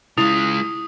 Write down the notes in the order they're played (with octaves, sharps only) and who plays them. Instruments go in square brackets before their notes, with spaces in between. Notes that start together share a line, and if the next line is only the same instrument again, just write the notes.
[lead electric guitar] C#3 G#3 [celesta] E4 F7 [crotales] D#6